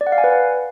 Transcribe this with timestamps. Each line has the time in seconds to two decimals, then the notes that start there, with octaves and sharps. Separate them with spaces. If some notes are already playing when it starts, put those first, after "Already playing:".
0.01 D5
0.07 F#5
0.12 F5
0.18 G#5
0.24 B4